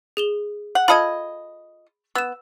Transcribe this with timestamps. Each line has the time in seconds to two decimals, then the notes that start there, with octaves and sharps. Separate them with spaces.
0.17 G#4 E7 G7
0.75 F#5
0.88 F4 A4 D#5 B5 D#6 G#6
2.15 B3 E6 E7